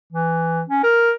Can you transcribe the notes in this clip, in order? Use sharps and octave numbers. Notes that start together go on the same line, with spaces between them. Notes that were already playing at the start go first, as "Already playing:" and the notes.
E3
C#4
A#4